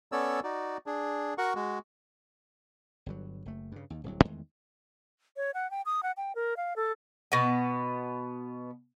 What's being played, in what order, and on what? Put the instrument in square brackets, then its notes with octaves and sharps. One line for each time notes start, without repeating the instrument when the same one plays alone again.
[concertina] B3 C#4 A4 C#5 D5 E6
D#4 F#4 D5
D4 G#4
F#4 A#4 F#5 C#6
G#3 F#4
[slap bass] G1 G2 F#3
F#1 A3
G2 C#3
D#2
D1 C2 F#3
E2 D#3 G#3 A3
[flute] C#5
F#5
G5
D#6
F#5
G5
A#4
F5
A4
[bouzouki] B2 B3